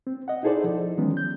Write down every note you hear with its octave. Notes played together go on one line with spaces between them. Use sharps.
C4
D#5 F#5
D#4 E4 G#4 A4 C5 D5
F3
D#3 E3 F#3 G#3 B3 C#4
G6